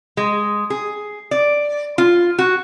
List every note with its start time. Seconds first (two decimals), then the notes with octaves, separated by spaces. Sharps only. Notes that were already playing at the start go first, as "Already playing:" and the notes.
0.17 G#3
0.70 G#4
1.31 D5
1.98 F4
2.39 F#4